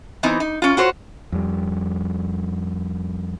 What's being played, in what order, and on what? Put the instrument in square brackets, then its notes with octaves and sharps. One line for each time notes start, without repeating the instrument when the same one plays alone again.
[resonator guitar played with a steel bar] E3 B3 C4 D#4
D#4
C#4 F4
F4 F#4 C5 C#5
[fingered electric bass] F2 G3